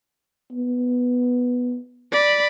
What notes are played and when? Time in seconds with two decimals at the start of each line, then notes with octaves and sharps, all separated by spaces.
0.51 B3
2.12 D5 B5